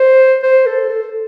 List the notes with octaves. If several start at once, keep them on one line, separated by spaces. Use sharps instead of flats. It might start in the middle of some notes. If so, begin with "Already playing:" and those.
Already playing: C5
C5
A4
A4